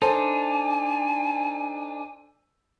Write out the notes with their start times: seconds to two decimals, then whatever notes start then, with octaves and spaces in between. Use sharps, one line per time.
0.02 D4 D#4 A4 C5 G#5